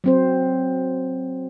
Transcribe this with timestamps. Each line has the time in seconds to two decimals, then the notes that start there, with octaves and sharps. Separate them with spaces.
0.04 F#3 C4 C5